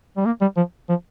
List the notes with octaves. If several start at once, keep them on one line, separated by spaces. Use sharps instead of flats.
G3
A#3
G3
F3
F3